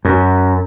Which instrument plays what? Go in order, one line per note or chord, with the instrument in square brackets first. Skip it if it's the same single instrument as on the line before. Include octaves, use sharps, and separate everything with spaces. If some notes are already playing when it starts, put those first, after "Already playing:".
[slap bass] F#2